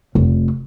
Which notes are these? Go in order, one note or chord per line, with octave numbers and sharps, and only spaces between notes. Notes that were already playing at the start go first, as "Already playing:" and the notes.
F1